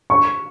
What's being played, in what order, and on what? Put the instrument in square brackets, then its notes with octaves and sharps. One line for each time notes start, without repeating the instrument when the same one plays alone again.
[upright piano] C#6